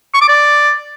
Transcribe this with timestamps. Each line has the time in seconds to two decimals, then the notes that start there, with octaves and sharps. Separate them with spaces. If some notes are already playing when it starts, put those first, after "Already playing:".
0.14 C#6
0.21 D6
0.29 D5